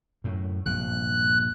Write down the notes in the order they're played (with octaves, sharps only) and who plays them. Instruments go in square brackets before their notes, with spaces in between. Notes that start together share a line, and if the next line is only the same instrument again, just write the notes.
[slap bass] F#2 A2
[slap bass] A#1 G2 C3 [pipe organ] F#6